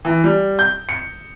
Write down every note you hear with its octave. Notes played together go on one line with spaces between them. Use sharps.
E3
G3
G6
C#7